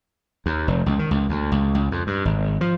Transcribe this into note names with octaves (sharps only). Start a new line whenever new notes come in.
D#2
F1
C#2
D#3
C#2
D2
C#2
C#2
F2
G2
G#1
F3